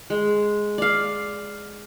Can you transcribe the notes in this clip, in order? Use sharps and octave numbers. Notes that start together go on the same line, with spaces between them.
G#3
D5 F5